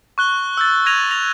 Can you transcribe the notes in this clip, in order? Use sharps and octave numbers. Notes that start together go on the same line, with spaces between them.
C#6 F#6 G7
E6 G6 A6
G#6 A#6 D#7 F7
A#6 F7